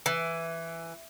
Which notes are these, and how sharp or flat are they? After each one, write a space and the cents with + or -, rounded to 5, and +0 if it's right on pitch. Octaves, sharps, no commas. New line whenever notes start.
E3 +10